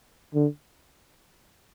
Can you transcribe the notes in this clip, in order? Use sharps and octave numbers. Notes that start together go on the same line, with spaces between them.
D3